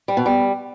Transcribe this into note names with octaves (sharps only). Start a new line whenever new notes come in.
G3
B2
G3